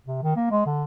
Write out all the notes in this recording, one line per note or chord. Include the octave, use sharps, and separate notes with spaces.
C3
D#3
A#3
G#3
D3